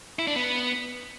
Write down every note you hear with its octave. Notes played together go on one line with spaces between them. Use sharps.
E4
D4
B3